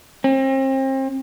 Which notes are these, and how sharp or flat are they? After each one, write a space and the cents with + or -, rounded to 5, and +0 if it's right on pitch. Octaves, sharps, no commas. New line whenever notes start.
C4 +35